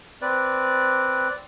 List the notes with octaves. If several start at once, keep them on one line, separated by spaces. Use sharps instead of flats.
C4 B4 D5